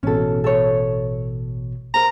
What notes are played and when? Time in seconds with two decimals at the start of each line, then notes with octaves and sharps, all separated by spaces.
0.03 A1 B2 C#4 A4
0.44 A4 C#5
1.94 A#4 C5 A#5